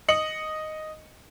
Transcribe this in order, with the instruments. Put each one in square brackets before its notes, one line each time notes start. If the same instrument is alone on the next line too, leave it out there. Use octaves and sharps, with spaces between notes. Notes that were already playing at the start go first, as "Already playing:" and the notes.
[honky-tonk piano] D#5 C#7 F#7